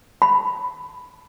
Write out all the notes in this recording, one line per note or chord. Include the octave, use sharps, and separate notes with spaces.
B5